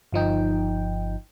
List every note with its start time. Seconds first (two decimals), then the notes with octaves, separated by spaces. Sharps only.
0.12 G1 F3 D#4 G5